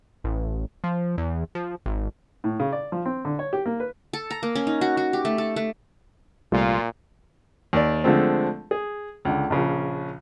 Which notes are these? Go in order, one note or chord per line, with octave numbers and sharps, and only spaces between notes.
A1
F3
E2
F3
G#1
A2
C#3
D5
F3
C4
D3
C#5
G4
A#3
B4
A4
A#5
A#3
C#4
D#4
F#4
F#4
G4
A3
A4
A3
C2 A#2 G3 A3 F4
D#2 D5
D3 F3 G#3 A3 C4
G#4
C#2 D3
A#1 C#3 F3